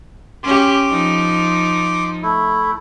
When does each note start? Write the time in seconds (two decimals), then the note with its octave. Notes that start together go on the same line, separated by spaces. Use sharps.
0.44 C#4 G4 C6 D6
0.90 F3 D#4
2.23 A3 E4